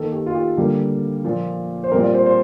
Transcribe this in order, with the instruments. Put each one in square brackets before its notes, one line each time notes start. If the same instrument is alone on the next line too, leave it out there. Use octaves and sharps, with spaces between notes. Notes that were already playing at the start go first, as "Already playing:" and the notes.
Already playing: [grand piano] D#3 A#3 A4
G4
F4
G4
D3 G3 A#3
A#2 F3 A#3
C5
A#2 G3 C4 A#4
D5
C5
C5